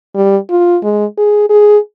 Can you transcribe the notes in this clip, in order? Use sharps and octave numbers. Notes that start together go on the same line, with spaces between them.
G3
F4
G#3
G#4
G#4